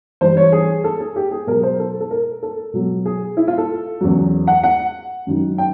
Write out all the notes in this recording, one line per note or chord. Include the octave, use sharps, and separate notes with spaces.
G2 E3 G3 C5
C#5
G#4
A4
G#4
G4
G#4
B2 F#3 A#4
C5
A4
A4
A#4
A4
B2 F#3
G#4
E4
F4
A4
E2 C#3 F#3
F#5
F#5
F#2 D#3 F#3
G5